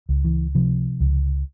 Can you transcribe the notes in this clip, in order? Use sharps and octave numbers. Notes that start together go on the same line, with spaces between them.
C#2
E3
C3 F3
C#2